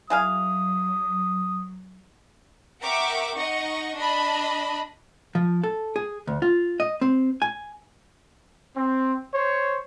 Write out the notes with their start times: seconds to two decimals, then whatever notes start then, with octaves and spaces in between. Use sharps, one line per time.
0.10 F#3 E4 G#4 F5 D#6
2.83 A#4 E5 F#5 G5 C#6 D6
3.35 D#4 D#5 F#5 C#6
3.96 D4 D#5 A5 B5
5.35 F3
5.64 A4
5.96 G#4
6.27 D2
6.42 F4
6.80 D#5
7.01 C4
7.42 G#5
8.76 C4
9.34 C5 C#5